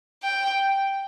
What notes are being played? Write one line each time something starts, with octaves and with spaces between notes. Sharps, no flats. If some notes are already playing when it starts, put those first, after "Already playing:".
G5